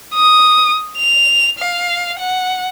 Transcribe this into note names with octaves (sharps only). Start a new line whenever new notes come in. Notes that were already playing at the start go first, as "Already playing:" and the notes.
D#6
F7
F5
F#5